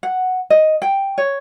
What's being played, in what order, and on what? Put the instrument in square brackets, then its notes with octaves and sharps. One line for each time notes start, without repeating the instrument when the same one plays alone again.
[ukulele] F#5
D#5
G5
C#5